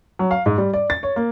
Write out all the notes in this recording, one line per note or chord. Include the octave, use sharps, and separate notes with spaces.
F#3
F5
G#2
G3
D5
A6
C#5
A#3